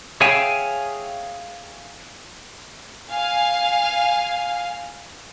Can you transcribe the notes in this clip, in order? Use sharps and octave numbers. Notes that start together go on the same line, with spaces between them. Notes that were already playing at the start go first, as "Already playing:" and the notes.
G#4 C#5 E5 F5 G5 G#5
F5 G#5